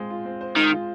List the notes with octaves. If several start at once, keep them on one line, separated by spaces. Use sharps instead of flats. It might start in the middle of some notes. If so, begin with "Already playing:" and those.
Already playing: G#3 C4 F4 C5
F4
C4
C5
D#3 G#3
F4